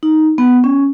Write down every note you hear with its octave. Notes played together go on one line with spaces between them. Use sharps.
D#4
B3
C#4